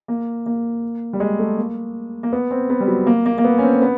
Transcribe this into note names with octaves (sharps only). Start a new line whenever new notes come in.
A#3
A#3
G3
G#3
A3
A#3
A#3
B3
C4
B3
G3
F#3
A#3
A#3
A#3
B3
C#4
C4
C4
B3